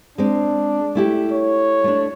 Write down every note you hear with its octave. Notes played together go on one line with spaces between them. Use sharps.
G#3 C4 D4
A3 E4 G4
C#5
A3 D4